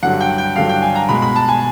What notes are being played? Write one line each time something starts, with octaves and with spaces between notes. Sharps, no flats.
G2 D3 F#3 F#5
G5
G5
G2 D3 F#3 F5
G5
G#5
A#5
B2 G#3 B5
B5
A5
G#5